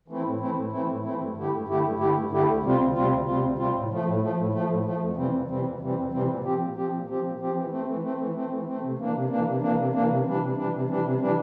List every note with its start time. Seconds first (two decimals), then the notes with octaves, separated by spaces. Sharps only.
0.08 E3 A3 C4 E4
0.25 A2
0.40 E3 A3 C4 E4
0.56 A2
0.72 E3 A3 C4 E4
0.88 A2
1.03 E3 A3 C4 E4
1.19 G2
1.36 D3 A3 E4 G4
1.51 G2
1.68 D3 A3 E4 G4
1.83 G2
1.99 D3 A3 E4 G4
2.15 G2
2.31 D3 A3 E4 G4
2.47 D2
2.63 C3 G3 C4 F4
2.79 D2
2.95 C3 G3 C4 F4
3.10 D2
3.26 C3 G3 C4 F4
3.43 D2
3.58 C3 G3 C4 F4
3.74 A2
3.90 F3 A3
4.05 A2
4.21 F3 A3
4.37 A2
4.53 F3 A3
4.69 A2
4.85 F3 A3
5.02 F2
5.16 C3 E3 G3 C4
5.32 F2
5.48 C3 E3 G3 C4
5.64 F2
5.80 C3 E3 G3 C4
5.96 F2
6.12 C3 E3 G3 C4
6.28 A#2
6.43 F3 C4 G4
6.59 A#2
6.76 F3 C4 G4
6.92 A#2
7.07 F3 C4 G4
7.23 A#2
7.40 F3 C4 G4
7.56 E3
7.70 A3 C4
7.87 E3
8.03 A3 C4
8.18 E3
8.34 A3 C4
8.51 E3
8.66 A3 C4
8.82 C3
8.98 E3 A#3 D4
9.14 C3
9.29 E3 A#3 D4
9.46 C3
9.61 E3 A#3 D4
9.77 C3
9.93 E3 A#3 D4
10.08 C3
10.26 E3 G3 D4
10.40 C3
10.56 E3 G3 D4
10.73 C3
10.88 E3 G3 D4
11.04 C3
11.20 E3 G3 D4